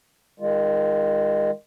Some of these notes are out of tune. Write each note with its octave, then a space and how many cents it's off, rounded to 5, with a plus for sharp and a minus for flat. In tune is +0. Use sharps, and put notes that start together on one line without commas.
D#3 +0 G#3 -30 F4 +0